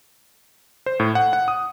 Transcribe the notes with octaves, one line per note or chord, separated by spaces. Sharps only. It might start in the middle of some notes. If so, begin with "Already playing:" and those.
C5
A2
F#5
F#5
D#6